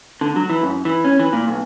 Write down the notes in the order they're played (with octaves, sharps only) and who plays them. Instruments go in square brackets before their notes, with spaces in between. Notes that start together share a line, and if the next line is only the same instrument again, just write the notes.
[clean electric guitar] D3
F#3
E3
F#2
E3
C#4
E3
A#2
B1